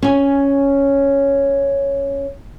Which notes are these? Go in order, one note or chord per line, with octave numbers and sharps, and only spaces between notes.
C#4 G#5